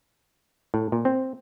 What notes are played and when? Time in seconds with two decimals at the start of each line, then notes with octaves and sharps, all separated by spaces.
0.74 A2
0.92 A#2
1.05 C4